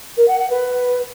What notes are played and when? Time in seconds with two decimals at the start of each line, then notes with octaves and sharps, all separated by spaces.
0.17 A#4
0.28 F#5
0.39 F#5
0.50 B4